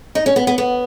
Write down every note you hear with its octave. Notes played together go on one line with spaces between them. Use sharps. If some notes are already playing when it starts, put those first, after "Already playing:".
D#4
C#4
B3
B3
B3